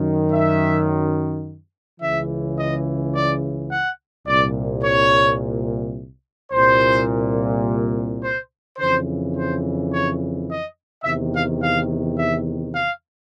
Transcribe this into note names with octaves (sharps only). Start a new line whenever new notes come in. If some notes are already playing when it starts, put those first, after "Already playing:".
Already playing: F#2 D#3
E5
C#2 C#3 E3 E5
D#5
D5
F#5
C2 A#2 D5
C#5
C2 A#2 C5
C5
F2 C#3 E3 C5
C5
C#5
D#5
E2 C3 D#3 E5
F5
F5
E5
F5